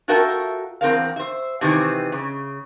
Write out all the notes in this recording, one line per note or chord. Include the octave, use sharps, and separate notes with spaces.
F4 F#4 A4 A#4 E5 G5
E2 C4 A#4 F5
C5 E5
C3 D#3 E3 C4
C#3